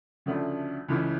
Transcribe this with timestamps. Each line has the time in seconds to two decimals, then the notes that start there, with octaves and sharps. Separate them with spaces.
0.26 D2 C#3 F3 A3 D4
0.88 C#2 C#3 E3 A3 C#4